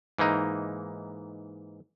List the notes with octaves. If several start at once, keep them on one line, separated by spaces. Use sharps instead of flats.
G#2 E3 A#3 D#4